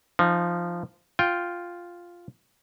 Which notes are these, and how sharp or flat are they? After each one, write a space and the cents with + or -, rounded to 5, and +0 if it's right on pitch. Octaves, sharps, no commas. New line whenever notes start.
F3 -10 D#4 -25
F4 +0 G5 +0